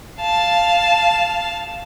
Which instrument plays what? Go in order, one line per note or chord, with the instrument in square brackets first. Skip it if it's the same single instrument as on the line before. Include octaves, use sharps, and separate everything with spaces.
[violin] F5 A5